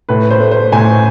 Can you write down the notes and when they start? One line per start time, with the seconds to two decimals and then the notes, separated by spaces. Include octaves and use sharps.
0.09 A2 B4
0.30 C5
0.40 A3
0.51 C5
0.72 A2 G#5